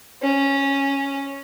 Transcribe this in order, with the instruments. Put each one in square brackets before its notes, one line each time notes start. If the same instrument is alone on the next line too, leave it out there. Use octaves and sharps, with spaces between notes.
[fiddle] C#4